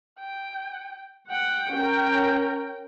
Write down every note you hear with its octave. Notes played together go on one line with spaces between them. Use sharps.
G5
F#5 G5
C#4 A#4